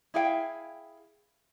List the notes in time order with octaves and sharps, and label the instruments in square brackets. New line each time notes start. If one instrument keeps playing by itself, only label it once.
[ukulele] E4 G#4 F5 G5